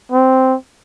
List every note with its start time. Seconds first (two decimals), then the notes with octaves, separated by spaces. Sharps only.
0.12 C4